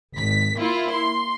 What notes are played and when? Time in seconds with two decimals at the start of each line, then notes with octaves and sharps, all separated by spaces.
0.15 G#1 B6
0.58 A#3 E4 F4
0.91 C6